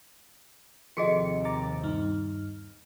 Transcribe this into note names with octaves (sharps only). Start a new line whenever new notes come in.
D#2 C3 F3 F#4 G#4 A4 D#5 C#7
A#5 D6 A6
G2 D#4 F6